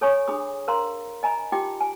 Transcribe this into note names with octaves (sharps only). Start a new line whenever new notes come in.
A4 C#5 G#5 B5 C#6
D4 G#4 B5 D#6
A#4 C5 F5 A#5 C6
D#5 G#5 A#5 B5
D#4 F4 G4 G5 D6
G#5